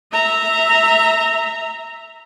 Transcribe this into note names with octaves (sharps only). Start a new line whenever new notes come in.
E5 A#5